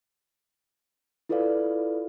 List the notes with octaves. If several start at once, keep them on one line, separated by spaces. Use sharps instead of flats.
E4 F4 A4 B4 D5 F5